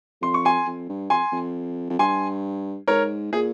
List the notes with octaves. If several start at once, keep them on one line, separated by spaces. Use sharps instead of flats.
F2 C6
C#6
G#5 C6
F2
G2
F2 G#5 C6
F2
F2
G2 G#5 C6
G#2 A#4 C#5
A#2 G#4